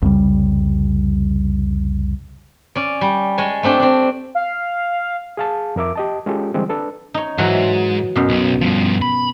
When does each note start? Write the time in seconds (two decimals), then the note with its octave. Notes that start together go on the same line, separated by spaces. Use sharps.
0.02 C2 F2 C#3 G3
2.75 C#4 D5
3.01 G3
3.38 G#3 C#5 G#5 A5
3.63 A3 C4 D4 G4
3.79 C4 D4
4.35 F5
5.37 G#4 F5 A5
5.76 F2 A#4 E5 D6
5.96 G4 D#5 A5
6.26 G#3 C#4 F4 G4 A4
6.54 D3 E3 G3 G#3 C4
6.69 D4 A4 B4
7.14 D#4 C#5
7.38 G#2 E3 F#3
8.16 F#2 B2
8.29 B1
8.61 G2 F3
9.02 B5